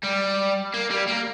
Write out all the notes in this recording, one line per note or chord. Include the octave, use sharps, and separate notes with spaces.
G3
A#3
G3
A#3